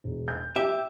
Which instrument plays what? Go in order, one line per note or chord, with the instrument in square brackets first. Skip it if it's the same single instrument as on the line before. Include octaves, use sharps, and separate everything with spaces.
[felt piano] E1
G6
[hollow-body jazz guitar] G4 [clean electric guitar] E5